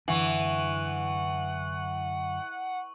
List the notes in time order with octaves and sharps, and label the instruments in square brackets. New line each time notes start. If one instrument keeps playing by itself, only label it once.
[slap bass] F#2 D3 D4 [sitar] E3 [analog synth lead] F#5 [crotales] C#6 F#7